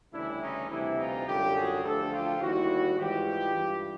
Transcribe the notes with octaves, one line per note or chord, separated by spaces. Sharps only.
D2 C#3 E3 G3 D4 E4
C#4 D#4
D2 C3 E3 G3 D4 E4
D#4 F4
F#2 D3 G3 F4 G4
F#4 G#4
D2 D3 F3 G4 A4
F4 G4
D#2 D#3 G3 E4 F#4
G#2 E3 G3 F4 G4
G2 E3 G3